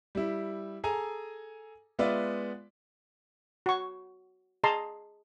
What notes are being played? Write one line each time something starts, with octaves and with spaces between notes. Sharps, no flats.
G3 E4
G#4 A4 G#5 A#5
G#3 B3 F4 B4 D5 E5
F#4 C#6
G#4 D#5 A5 A#5 C6